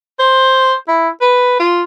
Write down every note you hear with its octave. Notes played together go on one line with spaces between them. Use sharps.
C5
E4
B4
F4